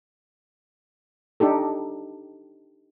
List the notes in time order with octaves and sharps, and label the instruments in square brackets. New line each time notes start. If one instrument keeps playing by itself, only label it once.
[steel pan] D4 D#4 G4 A4